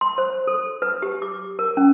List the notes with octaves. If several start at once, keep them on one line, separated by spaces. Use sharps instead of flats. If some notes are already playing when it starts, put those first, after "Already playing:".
C6
C5
A4
B4
G4
D6
A#4
C#4